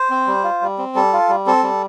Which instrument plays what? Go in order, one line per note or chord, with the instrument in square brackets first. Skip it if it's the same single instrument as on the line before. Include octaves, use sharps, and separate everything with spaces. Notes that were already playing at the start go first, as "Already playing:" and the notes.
Already playing: [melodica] C5
C4
G3
F4
G3
C4
G3 A4
F4
G3
C4 A4
G3